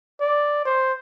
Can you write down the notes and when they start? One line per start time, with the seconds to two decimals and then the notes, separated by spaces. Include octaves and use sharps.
0.20 D5
0.65 C5